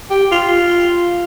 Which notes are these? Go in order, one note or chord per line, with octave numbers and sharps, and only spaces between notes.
G4
F4